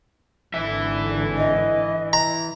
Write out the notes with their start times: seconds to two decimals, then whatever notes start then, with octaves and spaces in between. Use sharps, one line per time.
0.54 G#1 D3 E3 E5
1.37 D#5
2.13 A#5